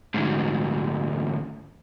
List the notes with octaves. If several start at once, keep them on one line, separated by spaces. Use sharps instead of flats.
D2 G#2